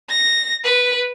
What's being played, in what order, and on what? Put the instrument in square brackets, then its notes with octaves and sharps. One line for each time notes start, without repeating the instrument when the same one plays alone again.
[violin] A#6
B4